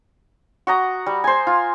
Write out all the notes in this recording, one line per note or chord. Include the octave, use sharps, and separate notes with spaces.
F#4 D#5 A#5
G3
C5 G#5
F4